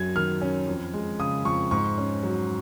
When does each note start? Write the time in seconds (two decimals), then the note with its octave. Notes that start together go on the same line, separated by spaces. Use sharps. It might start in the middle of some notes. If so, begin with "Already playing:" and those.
Already playing: F#2 F#3 G#6
0.15 D#3 F6
0.42 C#4
0.67 F2
0.93 G#3
1.20 C#3 D#6
1.45 F2 C#6
1.71 G#2 C#6
1.98 C#4
2.23 F#3